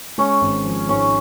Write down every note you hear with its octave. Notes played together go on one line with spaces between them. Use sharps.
G#3 C#4
G#1
F3
G#2 C#4